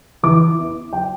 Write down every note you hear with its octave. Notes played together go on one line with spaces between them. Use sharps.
E3 D6
B3 E4
F#3 G5